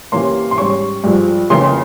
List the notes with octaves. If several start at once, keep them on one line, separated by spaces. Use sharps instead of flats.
C3 E3 A#3 C#4 C6
C6
G#2 G3 C#4 C#6
G2 F3 G#3
F2 C#3 E3 A#3 C6